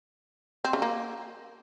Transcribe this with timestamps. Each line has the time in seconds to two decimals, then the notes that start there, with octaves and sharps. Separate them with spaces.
0.64 C4
0.73 C#3
0.82 A#3